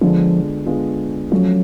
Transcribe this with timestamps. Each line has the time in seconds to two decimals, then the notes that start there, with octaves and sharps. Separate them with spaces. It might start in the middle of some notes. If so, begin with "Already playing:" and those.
0.01 D3 F3 G#3 B3 F4
0.66 D3 G#3 B3 F4
1.31 F3 F#3 A3 C#4 F#4